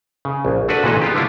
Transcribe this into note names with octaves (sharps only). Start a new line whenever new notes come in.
C#3
A#1
A3 D4 F#4 A4 B4 D5
A#2 C#3 E3 G#3 A4 D#5
B3 F4 G4
D3 G3 A3 D4 E4 F4